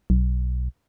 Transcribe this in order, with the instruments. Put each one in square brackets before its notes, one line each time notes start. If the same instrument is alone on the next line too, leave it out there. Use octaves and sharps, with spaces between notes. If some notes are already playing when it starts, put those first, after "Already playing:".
[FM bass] B1